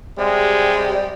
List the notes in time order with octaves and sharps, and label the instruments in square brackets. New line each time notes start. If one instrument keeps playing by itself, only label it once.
[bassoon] C3 [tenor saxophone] G3 [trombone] G#3